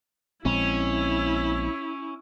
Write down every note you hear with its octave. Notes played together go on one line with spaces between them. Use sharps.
A#1 G#3 C4 C#4 E4